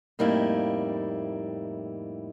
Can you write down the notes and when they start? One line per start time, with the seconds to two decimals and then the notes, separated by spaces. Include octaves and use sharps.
0.19 F2 A2 G3 A#3 D#4 E4